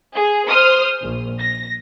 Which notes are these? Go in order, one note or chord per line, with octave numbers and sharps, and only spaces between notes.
G#4
C5 D#6 F6
A#1
A#6